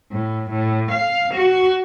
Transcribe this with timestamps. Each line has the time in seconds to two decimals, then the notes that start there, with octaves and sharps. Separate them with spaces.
0.12 A2
0.50 A2
0.91 F5
1.34 F#4